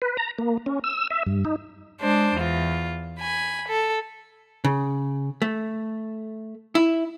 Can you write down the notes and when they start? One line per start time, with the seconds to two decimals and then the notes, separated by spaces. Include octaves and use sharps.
0.02 B4
0.17 A#5
0.39 A#3
0.66 C#4
0.84 E6
1.10 E5
1.26 G2
1.45 D#4
2.01 G#3 D4 C5
2.36 E2 F4
3.20 G#5 B5
3.69 A4
4.65 C#3
5.42 A3
6.75 E4